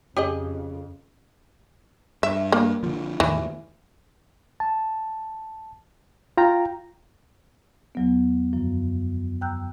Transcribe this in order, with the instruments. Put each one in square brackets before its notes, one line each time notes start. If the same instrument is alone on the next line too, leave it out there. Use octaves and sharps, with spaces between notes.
[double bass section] F2 [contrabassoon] C#3 [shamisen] G4 G#4 D#5
[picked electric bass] G2 [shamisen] E5
[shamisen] A#3
[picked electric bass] D3 F3
[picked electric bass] E2 A2 D#3 [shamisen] E3
[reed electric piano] A5
F4 G5 A#5
[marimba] E2 F#3 B3
F#2 D3 F3 F#3
G5 A#5 E6 F#6 G6